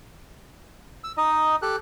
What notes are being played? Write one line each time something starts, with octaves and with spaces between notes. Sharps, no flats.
E6
D#4 D#5
G4 A4 F#6